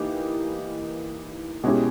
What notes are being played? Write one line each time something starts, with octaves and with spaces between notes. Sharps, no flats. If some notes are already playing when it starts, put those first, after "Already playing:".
Already playing: E3 A#3 D#4 G4
B2 G#3 C#4 E4 G4